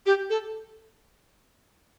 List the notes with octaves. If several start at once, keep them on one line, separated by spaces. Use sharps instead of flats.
G4
A4